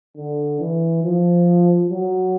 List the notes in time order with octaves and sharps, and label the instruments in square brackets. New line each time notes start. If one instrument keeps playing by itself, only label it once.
[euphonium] D3
E3
F3
F#3